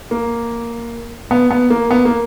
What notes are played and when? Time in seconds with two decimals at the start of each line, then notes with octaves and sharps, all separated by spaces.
0.11 A#3
1.31 B3
1.51 B3
1.70 A#3
1.91 B3
2.05 A#3